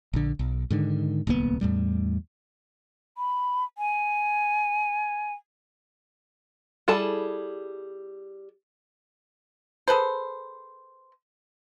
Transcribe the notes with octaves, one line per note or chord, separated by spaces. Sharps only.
A#1 D3
B1
G#2 D3 D#3
D1 C2 A#3 B3
E2 A2 G3
B5
G#5
G3 E4 G#4 A4 A5
G#4 A4 B4 C5